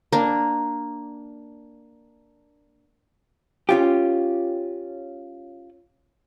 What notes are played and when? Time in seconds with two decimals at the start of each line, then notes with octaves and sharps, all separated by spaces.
0.12 A#3 D4
3.69 C#4 F4 G4